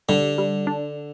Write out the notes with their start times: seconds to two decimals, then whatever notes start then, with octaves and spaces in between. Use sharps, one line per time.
0.09 D3 G3
0.38 G3
0.67 D4